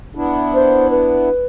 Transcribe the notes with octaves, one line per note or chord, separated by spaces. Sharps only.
B3 D4 E4
C5
B4